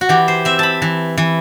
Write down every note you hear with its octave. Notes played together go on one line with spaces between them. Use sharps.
F#4
E3 G4
C5
C4 E5
A5 B5
E3
E3